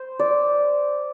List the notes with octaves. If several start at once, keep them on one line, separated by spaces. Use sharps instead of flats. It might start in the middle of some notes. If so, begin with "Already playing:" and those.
Already playing: C5
D5